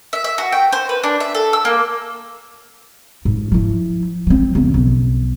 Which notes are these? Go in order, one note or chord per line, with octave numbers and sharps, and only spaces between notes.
E5
E5
F#4
G5
C5
B4
D4
E5
A4
E6
A#3
G#2
F3 E4
F3 C4
E2 C#3
B1